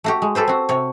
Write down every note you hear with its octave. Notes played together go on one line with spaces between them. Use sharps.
A3 F#4 G4
G#3
G4 A4 B4 C5
C4 F#4
C3 C#5